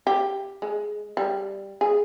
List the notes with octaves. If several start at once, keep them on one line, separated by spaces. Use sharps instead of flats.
G4
G#3
G3
G#4